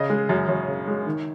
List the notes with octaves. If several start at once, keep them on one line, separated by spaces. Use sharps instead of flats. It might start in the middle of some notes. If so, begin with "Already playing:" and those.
Already playing: C#3 D#5
G#3
F#2
F#2 C#5
C#3
G#3
D#3